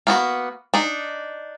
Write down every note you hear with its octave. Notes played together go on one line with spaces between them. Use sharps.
A#3 B3 F#4
D4 D#4